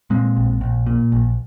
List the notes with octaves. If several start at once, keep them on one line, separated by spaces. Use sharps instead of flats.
A#2 G#3 C4
A#1
A#1
A#2
A#1